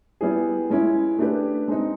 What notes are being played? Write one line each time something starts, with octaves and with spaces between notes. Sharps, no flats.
G3 B3 E4 G#4
G#3 C#4 E4
A3 D4 G4 B4
G#3 C4 D#4